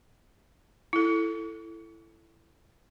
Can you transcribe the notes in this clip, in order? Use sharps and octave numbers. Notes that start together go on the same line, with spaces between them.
E4 A4